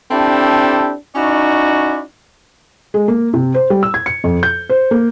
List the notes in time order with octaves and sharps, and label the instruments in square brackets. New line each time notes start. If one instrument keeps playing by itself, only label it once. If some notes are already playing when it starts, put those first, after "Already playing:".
[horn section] C4 D4 E4 G4 A4
C#4 D#4 E4 F#4 D5
[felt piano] G#3
A#3
C3
C5
G3
E6
G#6
C#7
F2
G6
C5
A#3